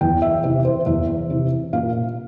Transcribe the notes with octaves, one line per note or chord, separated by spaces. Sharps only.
E2 G5
E5
C3 E3 E5
C5
E2 E5
C3 E3
A#2 F5